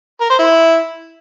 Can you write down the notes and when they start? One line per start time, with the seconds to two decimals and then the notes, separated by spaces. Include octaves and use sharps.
0.21 A#4
0.30 C5
0.39 E4